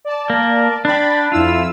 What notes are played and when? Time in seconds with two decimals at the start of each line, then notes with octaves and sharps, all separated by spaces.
0.05 D5 A5
0.30 A#3
0.85 D4 G5 B5 A6
1.32 F2 E4 F4 E6